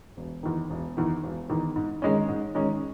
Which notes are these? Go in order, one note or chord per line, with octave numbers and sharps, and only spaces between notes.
E1
E2 D#3
E1
E2 D#3
E1
E2 D#3
G#2
D#3 G#3 C#4
G#2
D#3 G#3 C#4